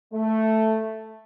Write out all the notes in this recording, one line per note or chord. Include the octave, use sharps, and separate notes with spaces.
A3